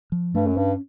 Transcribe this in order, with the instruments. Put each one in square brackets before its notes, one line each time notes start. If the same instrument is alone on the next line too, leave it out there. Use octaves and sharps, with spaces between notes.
[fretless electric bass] F3
[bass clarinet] G2 [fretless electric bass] A3
[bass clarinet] F#2
[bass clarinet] G2 [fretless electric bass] C#4